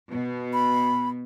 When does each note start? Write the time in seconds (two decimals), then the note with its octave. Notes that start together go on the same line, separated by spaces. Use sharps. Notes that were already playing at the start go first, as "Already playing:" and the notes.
0.10 B2
0.53 B5